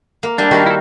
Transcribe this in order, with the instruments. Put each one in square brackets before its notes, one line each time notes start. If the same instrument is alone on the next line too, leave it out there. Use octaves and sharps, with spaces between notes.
[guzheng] A#3
[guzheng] G3 A#3 E4 [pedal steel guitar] D4
[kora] D#3 G3 F#4 [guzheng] A#3 A#4 F5
[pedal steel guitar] E4 A4